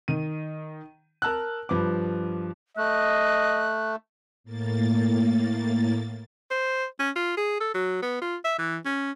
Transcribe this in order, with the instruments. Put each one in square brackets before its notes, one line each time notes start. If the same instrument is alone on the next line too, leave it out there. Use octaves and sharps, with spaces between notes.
[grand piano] D#3 D#7
A#4 A5 E6 F#6
G2 F3 B4 D6
[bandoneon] A3 [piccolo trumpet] D#5 [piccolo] F#6
[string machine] A2 A#3 A6
[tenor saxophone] C5
C#4
F4
G#4
A4
F#3
B3
F4
E5
E3
C#4